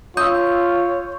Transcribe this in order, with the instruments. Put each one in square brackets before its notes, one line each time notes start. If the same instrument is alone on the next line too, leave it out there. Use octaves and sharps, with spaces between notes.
[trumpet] F4 [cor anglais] C#5 [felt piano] D#6 E6 [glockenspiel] G6